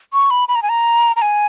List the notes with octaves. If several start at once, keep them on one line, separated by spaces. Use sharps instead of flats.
C#6
B5
B5
A#5
G#5
A#5
A#5
G#5